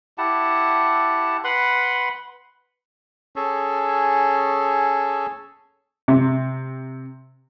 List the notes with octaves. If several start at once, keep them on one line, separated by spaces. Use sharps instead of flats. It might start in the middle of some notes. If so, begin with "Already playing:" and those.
E4 G4 F#5 A5
B4 F#5 B5 C6
C#4 G#4 A4
C3